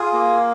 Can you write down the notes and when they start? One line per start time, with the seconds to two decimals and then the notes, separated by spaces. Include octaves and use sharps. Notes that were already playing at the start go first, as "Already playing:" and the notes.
Already playing: F4 G#4
0.13 A#3